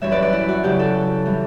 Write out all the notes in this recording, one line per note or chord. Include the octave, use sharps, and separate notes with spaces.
F#2 E3 G3 C#5 E5
B4 D5
B4 D5
E4
F#4
E2 C#3 F#3 E4 G4
F#4 A4
E3 G3